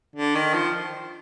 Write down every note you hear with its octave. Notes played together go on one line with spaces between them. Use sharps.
D3
D#3
F3